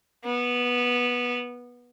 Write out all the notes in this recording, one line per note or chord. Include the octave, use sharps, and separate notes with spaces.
B3